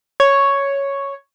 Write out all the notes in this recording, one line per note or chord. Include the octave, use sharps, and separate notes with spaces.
C#5